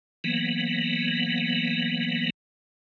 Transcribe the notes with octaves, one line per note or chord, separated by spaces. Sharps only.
E3 F#3 A#3 B3